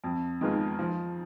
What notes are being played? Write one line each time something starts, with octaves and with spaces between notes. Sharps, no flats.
F2
D#3 G#3 B3 F4
F3